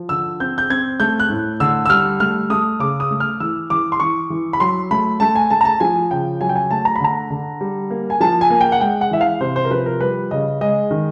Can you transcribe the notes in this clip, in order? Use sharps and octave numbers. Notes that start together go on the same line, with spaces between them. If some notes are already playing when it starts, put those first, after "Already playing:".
Already playing: F3
D3 E6
C4 G6
G6
C4 G#6
A3 G6
F#6
A2
D3 E6
E6
G3 F6
A3 F6
A3 D#6
C#3 D6
D#6
A3
F6
E3 E6
E3 D6
C6
E3 C#6
E3
B5
F#3 C6
A3 B5
A3 A5
G#5
A3 A5
A#5
A5
F3 G#5
C#3 G5
F#3 G#5
G5
G#5
A3 A5
A#5
B5
D3 A#5
D3
G3
A#3
G#5
F3 A5
G#5
A#3
G5
F#5
G#3 G5
F#5
E3 E5
F5
C3 C5
C5
A#4
F3 B4
A#4
G3 B4
C#3 D#5
G#3 D#5
D#3